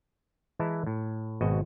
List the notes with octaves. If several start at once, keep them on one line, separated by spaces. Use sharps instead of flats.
E3 G#3 E4 D#5 A5 A#5
A2
G#1 B2 F#4 D#5